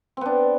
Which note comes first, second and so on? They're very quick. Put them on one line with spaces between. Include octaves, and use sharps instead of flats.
C4 B3 D4